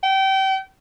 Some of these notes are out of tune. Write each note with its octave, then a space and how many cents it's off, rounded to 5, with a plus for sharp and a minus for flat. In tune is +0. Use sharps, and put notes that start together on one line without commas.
G5 -30